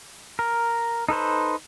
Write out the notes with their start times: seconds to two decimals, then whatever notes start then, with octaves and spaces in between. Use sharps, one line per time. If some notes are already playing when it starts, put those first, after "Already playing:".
0.39 A#4
1.09 D#4 A4 B4 C5